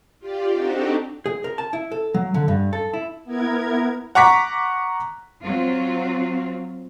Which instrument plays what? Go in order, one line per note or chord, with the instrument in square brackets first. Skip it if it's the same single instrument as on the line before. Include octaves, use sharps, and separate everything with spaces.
[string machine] F4 G4 D5
C4 D4 D#4 F#4 G4 A4
[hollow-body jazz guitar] G#4
A#4
A5
E4
A4
F#3
D3
G2
A4
E4
[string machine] B3 E4 A#4 G#6
[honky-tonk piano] F#5 A#5 C#6 D6 B6
[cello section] F#3 C4 F4